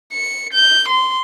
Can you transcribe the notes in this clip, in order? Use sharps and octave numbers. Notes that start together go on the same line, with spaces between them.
C#7
G6
C6